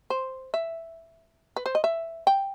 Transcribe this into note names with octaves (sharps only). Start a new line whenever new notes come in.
C5
E5
B4
C5
D#5
E5
G5